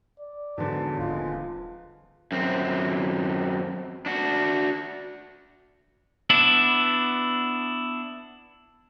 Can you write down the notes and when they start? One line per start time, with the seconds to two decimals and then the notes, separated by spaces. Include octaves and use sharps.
0.20 D5
0.58 E2 G#2 D3 F#3 A5
0.99 D#1 F3 G#3 F4
2.32 F#2 C4
4.06 D4 F#4
6.30 B3 D4 E4